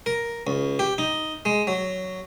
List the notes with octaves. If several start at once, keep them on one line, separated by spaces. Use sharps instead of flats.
A#4
C#2
G4
D#4
G#3
F#3